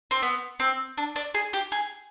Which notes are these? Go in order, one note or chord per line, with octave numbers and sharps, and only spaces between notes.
C4
B3
C4
D4
D4
G#4
G4
G#4